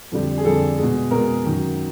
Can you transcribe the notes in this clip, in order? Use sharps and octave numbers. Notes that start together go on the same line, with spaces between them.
F2 D3 G3
G#4
F2 D3 G3 A4
B2 G#3
B2 G#3 A#4
F#2 D#3 F#3